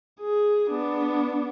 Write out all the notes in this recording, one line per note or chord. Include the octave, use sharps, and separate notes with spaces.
G#4
B3 D4